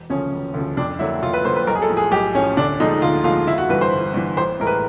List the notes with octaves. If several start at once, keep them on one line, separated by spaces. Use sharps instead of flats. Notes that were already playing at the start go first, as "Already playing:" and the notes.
Already playing: E1
D2 C#3 F3 C#4
E1
D2 C#3 F3
F2 D4
D3 F#3 A#3 E4
F2 F4
B4
D3 F#3 A#3 C5
B4
B1 A#4
G#4
A4
A2 F3
G#4
B1 G4
A2 F3 C#4
D2 D4
D3 F3 G#3 D#4
D2 F4
D3 F3 G#3 F4
G1 E4
F#4
G2 E3 B4
C5
G1
G2 E3
A1 C5
A2 E3 G#3 A#4
B4